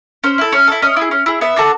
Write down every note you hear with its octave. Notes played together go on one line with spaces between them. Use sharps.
C#4 C5
E4 A4
C#4
E4 A4
C#4 D#5
E4 G#4
C#4
E4 G#4
B3 E5
D4 F#4 A4